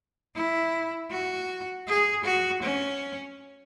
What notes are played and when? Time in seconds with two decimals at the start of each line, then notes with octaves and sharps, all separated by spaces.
0.36 E4
1.11 F#4
1.88 G#4
2.25 F#4
2.63 C#4